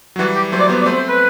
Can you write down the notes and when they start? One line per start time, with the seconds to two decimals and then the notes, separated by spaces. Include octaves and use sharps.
0.16 F#3
0.19 E3 G3 F#4
0.35 G4
0.52 F#3 A3 C5
0.59 D5
0.67 G3 B3 C5
0.80 D5
0.86 A3 C4 C5
0.97 C5
1.08 B4